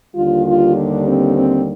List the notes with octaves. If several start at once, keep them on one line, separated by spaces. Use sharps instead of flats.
D#2 D3 G3 F4
F4
D4
C4
C4